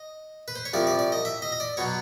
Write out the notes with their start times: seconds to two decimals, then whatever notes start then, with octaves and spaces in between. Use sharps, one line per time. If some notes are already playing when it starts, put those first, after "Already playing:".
Already playing: D#5
0.48 B4
0.56 C5
0.65 C#5
0.73 C2 C3 F3 D5
0.87 D5
0.99 D5
1.12 D#5
1.25 E5
1.42 D#5
1.52 D#5
1.60 D5
1.77 B2 F#3 C#5